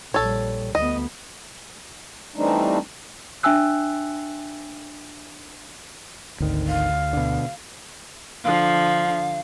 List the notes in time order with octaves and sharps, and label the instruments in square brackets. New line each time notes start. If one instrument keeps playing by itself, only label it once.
[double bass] A#1 G3 [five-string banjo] A4 C#5
[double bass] D2 B3 [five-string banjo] D#5
[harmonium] E3 G3 A3 C4 D4 D#4
[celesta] D4 E5 G5 G#5 E6 F#6
[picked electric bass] G#1 D#3 [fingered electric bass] D2
[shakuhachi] F5
[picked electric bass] B2 D3
[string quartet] D3 F3 [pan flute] F5